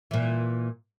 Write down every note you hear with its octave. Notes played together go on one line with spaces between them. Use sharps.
A#2 E3